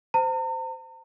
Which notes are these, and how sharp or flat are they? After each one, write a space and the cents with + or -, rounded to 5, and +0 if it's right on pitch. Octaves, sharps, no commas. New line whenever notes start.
C5 -20 A#5 -45